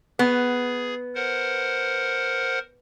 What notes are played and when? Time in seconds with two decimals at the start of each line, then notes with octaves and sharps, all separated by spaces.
0.19 B3 G#4
1.15 A#4 C5 F#5